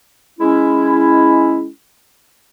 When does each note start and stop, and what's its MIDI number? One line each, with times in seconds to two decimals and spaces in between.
0.39 1.67 56
0.39 1.67 61
0.39 1.67 64